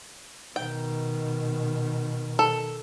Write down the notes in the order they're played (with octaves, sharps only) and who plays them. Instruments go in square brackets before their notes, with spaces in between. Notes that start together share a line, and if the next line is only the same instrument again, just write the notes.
[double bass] B2 D#3 [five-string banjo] G5
[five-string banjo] A4